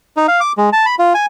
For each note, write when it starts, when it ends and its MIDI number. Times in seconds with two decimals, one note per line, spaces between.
0.17 0.27 63
0.28 0.40 77
0.40 0.52 86
0.57 0.70 56
0.73 0.86 81
0.86 0.95 83
0.99 1.13 65
1.14 1.26 80